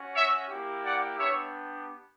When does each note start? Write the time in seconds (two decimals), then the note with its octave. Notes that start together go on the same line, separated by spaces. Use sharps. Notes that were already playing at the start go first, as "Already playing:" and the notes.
Already playing: C#4 F#4
0.13 C#5 E5
0.49 A#3 E4 G4
0.84 D5 F#5
1.18 B3 D4 G4 C#5 E5